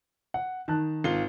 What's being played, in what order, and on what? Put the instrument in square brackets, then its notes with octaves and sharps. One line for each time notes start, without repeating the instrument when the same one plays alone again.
[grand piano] F#5
D#3 A5 F#6
[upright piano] G#1 F4 G7